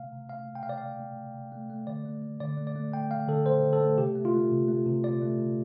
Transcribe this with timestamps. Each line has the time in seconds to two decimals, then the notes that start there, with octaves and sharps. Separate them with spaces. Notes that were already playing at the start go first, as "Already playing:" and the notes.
Already playing: C3 A3 F5
0.12 C3
0.29 A3 F5
0.46 A3
0.55 G5
0.63 C3 F5
0.69 D5
0.78 C3 F5
1.00 A3
1.17 C3
1.34 C3
1.52 A3
1.70 A3
1.87 D3 D5
2.05 A3
2.22 A3
2.40 D3 D5
2.57 A3
2.67 D5
2.76 A3
2.92 A3 G5
3.11 A3 F5
3.28 D3 A4
3.46 D3 C5
3.63 D3
3.73 A4
3.81 A3
3.98 C3 G4
4.15 A3
4.25 F4
4.34 A3
4.52 C3
4.68 A3
4.86 C3
5.04 C3 D5
5.22 A3
5.39 C3